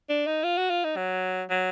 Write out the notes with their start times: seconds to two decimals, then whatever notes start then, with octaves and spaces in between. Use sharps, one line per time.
0.09 D4
0.27 D#4
0.43 F4
0.58 F#4
0.70 F4
0.84 D#4
0.96 F#3
1.50 F#3